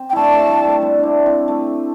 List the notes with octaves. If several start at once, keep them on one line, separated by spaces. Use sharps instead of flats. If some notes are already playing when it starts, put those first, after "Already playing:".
Already playing: C4
G5
A3 D4 E4 A5
A3
G3
A3
G3 C4
C4 D4 E4
C4 E4
A3